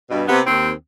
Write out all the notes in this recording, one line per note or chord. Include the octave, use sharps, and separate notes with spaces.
G2 B2
C3 B3
D#2 C4